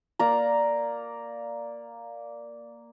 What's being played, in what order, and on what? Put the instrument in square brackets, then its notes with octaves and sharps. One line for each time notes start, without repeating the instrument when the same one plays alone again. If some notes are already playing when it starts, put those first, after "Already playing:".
[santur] A#3 D5 A#5